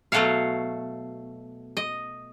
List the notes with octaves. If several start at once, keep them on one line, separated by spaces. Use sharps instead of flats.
B2 F#3 A3 F#4 C#5 F5
D#5